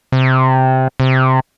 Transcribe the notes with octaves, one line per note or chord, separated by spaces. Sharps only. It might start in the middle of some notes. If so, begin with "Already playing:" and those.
C3
C3